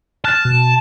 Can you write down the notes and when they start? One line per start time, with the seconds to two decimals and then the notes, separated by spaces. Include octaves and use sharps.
0.25 A5 F6 F#6 A6
0.45 B2